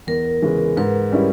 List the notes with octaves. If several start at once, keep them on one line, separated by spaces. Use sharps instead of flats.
E2 A#4
C#3 E3 G#3 C#4
G#2 B4
G3 C#4 E4